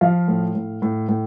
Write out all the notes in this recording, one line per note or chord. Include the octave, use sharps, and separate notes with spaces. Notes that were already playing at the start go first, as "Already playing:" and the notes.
F3 F5
A2
A2
A2
A2